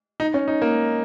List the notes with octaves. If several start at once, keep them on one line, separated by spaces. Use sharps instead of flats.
D#4
C#4
D#4
A#3